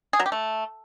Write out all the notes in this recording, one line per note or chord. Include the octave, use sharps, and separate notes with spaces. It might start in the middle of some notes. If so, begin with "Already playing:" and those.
G#4
F#3
G4
A3